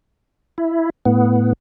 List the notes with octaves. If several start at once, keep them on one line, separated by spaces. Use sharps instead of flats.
E4
A2 B3